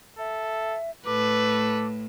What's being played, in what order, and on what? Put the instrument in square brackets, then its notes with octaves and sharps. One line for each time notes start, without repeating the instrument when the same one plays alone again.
[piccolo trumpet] A4 [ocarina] E5
[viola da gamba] A2 [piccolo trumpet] A4 [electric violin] B4 [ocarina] D6